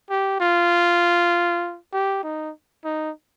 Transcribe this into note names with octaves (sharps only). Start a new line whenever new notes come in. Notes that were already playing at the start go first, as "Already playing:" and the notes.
G4
F4
G4
D#4
D#4